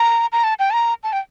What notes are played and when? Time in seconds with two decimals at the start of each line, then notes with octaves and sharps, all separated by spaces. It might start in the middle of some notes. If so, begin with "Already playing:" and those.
Already playing: A#5
0.32 A#5
0.44 A5
0.59 G5
0.70 A5
0.73 A#5
1.03 A5
1.13 G5